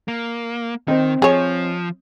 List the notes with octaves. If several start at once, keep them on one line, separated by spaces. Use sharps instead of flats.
A#3
D#3 C4 D#5
F3 G#4 C#5